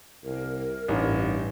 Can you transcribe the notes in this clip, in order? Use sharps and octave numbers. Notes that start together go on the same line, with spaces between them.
C2 A#4
A1 G2 D#4